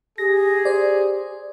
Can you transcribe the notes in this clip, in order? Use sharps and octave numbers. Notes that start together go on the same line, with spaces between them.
G4 G#4 A#6
C5 D5